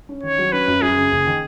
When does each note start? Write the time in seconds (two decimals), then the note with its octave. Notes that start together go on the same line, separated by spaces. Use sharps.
0.09 C#4
0.23 D#3 C#5
0.38 F#3
0.52 C#4 B4
0.67 F#2
0.82 F#2 G#4
0.97 C#3
1.11 F#1
1.27 D#3